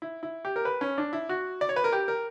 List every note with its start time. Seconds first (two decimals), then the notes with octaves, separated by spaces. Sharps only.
0.02 E4
0.23 E4
0.45 G4
0.56 A#4
0.65 B4
0.81 C#4
0.98 D4
1.13 E4
1.29 F#4
1.61 D5
1.69 C#5
1.76 B4
1.84 A#4
1.92 G4
2.08 A#4